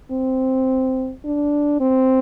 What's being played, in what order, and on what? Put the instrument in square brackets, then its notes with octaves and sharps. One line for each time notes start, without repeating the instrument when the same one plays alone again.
[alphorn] C4
D4
C4